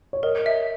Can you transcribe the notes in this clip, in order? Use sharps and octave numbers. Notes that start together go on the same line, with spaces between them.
C#5
A#4 D#5
E5